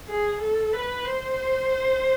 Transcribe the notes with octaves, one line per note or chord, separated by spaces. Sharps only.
G#4
A4
B4
C5